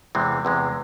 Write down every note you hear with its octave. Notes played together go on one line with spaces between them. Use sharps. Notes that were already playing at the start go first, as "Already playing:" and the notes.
E2 C3 E3 G#3 C4
E2 C3 E3 G#3